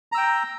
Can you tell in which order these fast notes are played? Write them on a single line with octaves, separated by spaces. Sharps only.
A#5 E6 G5